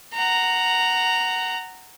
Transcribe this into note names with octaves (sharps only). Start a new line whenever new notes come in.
F#5 A#5